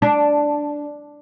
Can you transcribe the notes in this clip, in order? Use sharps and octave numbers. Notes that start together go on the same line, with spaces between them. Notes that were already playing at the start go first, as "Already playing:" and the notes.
D4